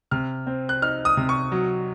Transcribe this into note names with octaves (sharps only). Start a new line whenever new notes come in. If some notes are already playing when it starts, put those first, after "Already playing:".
C3 F6
C4
F#6
D#4 F6
D#6
C3
C#6
F#3